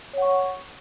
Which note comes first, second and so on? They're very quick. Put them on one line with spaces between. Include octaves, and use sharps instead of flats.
C#5 F#5 C#6